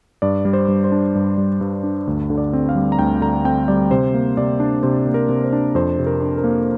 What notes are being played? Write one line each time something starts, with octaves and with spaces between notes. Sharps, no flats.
G2 D5
G3
C5
G2
C5
D4
G2
G3
G2
D4
D2
D3
D5
C4
F5
G3
A#5
D2 G5
D3 A#5
C4 G5
G3 D5
C3 C5
A#3
C3 D5
D4
C3 C5
A#3
A#4
C3
C5
D4
F2 C5
C3
A#4
D4
A#4
A#3